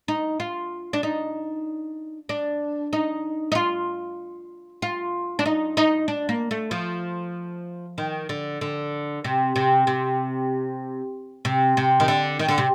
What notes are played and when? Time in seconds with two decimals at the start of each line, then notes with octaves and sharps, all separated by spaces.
0.08 D#4
0.40 F4
0.93 D4
1.03 D#4
2.29 D4
2.93 D#4
3.52 D#4
3.55 F4
4.82 F4
5.39 D4
5.46 D#4
5.77 D#4
6.08 D4
6.29 A#3
6.51 A3
6.71 F3
7.98 D#3
8.29 D3
8.61 D3
9.24 C3
9.56 C3
9.87 C3
11.45 C3
11.77 C3
12.00 D#3
12.08 D3
12.39 D#3
12.48 D3
12.58 C3